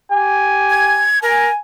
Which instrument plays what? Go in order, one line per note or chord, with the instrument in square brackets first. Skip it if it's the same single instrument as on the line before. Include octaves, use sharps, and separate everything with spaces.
[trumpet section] G4 G#5
[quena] G#6
[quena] A#4 [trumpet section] G#5